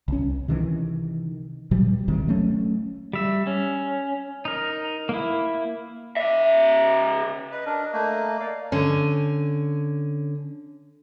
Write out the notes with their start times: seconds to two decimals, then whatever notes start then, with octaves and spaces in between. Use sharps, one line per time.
0.08 C2 C#4
0.48 C3 D#3 E3
1.71 A#2 F#3 G3
2.08 D1 G#1 C3 D#3
2.28 F#3 A3 C#4
3.13 G3 E5
3.47 C#4
4.45 D#4 A#4
5.09 A#3 E4
6.17 C#3 E5
7.52 B4 D#5
7.66 D4 A#4
7.93 A3 A#3
8.40 D5 F5
8.72 D3 C#4